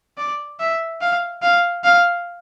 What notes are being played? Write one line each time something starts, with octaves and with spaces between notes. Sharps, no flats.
D5
E5
F5
F5
F5